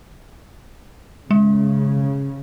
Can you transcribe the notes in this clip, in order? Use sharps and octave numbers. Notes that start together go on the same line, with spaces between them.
C#3 G#3